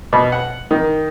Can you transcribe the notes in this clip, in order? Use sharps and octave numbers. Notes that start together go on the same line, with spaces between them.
B2
F#5
D#3